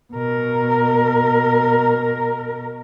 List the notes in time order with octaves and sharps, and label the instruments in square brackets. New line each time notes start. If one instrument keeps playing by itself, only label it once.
[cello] B2 A#4